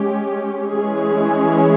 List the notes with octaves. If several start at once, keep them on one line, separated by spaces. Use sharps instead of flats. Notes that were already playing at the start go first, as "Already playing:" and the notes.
Already playing: G#3 C#4 G4
E3 G#3 C#4 G#4